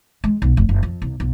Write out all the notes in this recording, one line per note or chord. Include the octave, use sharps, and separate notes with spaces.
G#3
B1
F1
F#1
F2
C2
B1